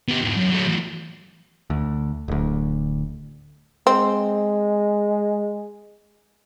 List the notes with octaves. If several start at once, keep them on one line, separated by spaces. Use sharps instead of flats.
B3 G4
E2 G#2
F#2
F#3 A3
E2 A2
D2
D1 D2
G#3 C4